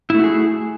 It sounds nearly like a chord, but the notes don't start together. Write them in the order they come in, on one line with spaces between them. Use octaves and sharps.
E4 A3 F#4 G#4